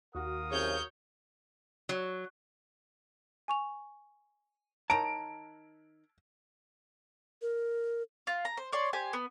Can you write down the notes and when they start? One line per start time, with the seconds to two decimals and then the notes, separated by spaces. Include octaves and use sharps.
0.15 D#2 F#4 A#4 F5 D#6
0.51 C2 F#2 C#3 C#5 G6
1.89 F#3
3.48 G#5 C#6 F7
4.90 D#3 C#5 A5 A#5 D7
7.42 A#4
8.27 F4
8.45 A#5
8.57 C5
8.73 C#5 D5 C6
8.93 G4 C5 G#5
9.13 B3